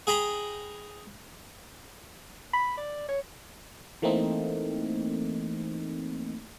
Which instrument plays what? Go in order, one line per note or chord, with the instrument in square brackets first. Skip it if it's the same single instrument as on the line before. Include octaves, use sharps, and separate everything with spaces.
[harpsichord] G#4 G5 A#5 B5
[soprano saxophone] B5
D5
C#5
[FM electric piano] E3 A3 A#3 C4 D#4